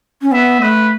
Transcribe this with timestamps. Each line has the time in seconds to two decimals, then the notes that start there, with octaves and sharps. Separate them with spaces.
0.22 C#4
0.32 B3 E5
0.61 A3 B4